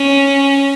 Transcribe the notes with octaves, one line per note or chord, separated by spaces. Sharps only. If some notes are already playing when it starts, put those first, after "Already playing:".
Already playing: C#4